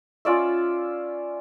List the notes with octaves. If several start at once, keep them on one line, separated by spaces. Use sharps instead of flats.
C#4 F4 D5 E5